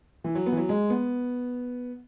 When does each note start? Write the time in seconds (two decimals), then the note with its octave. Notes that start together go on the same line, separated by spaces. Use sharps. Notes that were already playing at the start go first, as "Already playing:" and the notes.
0.24 E3
0.35 F#3
0.46 B3
0.52 E3
0.57 F#3
0.69 G#3
0.90 B3